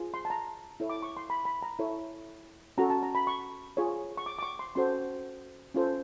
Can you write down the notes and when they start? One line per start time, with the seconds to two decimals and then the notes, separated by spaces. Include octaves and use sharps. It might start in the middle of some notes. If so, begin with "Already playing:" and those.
Already playing: F4 G#4
0.14 C6
0.25 A5
0.30 A#5
0.80 E4 A4 C#5
0.90 D6
1.03 C#6
1.17 C6
1.30 B5
1.45 B5
1.62 A#5
1.79 E4 A4 C#5
2.78 C#4 F#4 A4 A#5
2.90 A5
3.03 A#5
3.15 B5
3.27 C#6
3.77 F4 G#4 C#5
4.17 C#6
4.26 D6
4.39 D6
4.43 C#6
4.59 C6
4.75 C#4 F#4 A4 C5 C6
5.74 C#4 F4 A4 C5